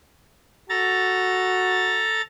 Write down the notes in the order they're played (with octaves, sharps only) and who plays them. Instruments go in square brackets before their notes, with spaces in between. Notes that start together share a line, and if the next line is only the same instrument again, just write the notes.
[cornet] F#4 [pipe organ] A4 A#5 A6